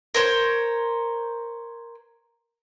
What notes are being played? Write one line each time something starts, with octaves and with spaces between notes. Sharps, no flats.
A#4 C5 C#5